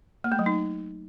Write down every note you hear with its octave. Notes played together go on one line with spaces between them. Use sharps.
A#3
A3
F#3
D#4